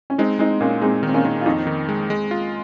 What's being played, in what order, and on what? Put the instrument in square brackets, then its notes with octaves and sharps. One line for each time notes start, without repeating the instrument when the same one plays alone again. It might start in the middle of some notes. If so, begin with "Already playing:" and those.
[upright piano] C#4
[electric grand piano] G#3 [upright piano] C4 D#4
[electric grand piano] G#3 [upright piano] C4 D#4
[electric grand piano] A#2 [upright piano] A#3 C#4
[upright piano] G#3 C4 [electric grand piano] D#4
[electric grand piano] D#3 [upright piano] C4
[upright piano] A#3 C#4
[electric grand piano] D#3
[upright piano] F4
[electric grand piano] F2 [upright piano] C4 D#4
[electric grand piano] D#3
G#3
G#3
F4